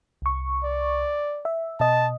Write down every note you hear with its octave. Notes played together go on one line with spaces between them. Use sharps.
C2 C#6
D5
E5
B2 D#5 A5